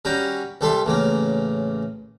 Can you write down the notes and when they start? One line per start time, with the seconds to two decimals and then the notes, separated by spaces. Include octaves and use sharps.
0.05 G3 C#4 F#4 G5 A#5
0.61 C2 G3 A4 E5 C6
0.86 A1 C#3 A#3